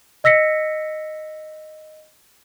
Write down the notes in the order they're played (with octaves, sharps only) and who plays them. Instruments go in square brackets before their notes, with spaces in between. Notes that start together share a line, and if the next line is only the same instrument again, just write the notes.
[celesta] D#5 E6 A#6 B6 C#7